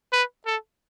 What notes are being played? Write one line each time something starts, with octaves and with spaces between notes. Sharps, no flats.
B4
A4